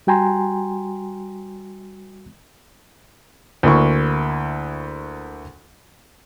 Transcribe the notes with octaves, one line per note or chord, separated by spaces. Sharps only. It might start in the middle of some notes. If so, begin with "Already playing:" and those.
G3 F#4 G5 G#5 A#5 C6
D2 A#3 E4 C#6